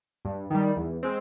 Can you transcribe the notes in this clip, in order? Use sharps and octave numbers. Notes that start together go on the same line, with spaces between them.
G2
D#3 G3
E2
G#3 C4